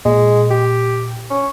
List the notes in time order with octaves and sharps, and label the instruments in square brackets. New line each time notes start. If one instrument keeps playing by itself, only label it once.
[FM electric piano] A#2 [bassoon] G#3
[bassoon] G4
C#4